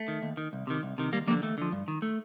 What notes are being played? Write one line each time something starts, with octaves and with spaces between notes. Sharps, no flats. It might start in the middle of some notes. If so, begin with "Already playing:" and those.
Already playing: A3
D#3
D#2
D#3
C2
C3 D#3
C2
C3 D#3
D#2 G3 A#3
D3 F3 G3 A#3
D#2 A3
D3 F3
G2
D#3
A3